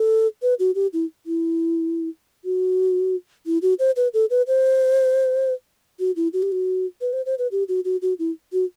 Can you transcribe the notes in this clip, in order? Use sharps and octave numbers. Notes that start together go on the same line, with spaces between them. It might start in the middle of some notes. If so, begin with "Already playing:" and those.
Already playing: A4
B4
F#4
G4
E4
E4
F#4
E4
F#4
C5
B4
A4
B4
C5
F#4
E4
F#4
G4
F#4
B4
C5
C5
B4
G4
F#4
F#4
F#4
E4
F#4